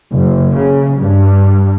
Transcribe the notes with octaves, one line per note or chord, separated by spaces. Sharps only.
F#1
C#3
G2